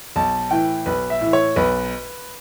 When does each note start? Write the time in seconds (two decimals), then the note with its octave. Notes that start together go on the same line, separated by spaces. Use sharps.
0.16 B1 A5
0.51 A2 E3 G5
0.86 B1 B4
1.10 E5
1.21 A2 E3
1.33 C#5
1.56 B1 B4